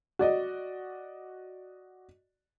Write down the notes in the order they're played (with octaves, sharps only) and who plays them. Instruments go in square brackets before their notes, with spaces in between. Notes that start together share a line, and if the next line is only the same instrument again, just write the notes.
[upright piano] F#4 D5 D#5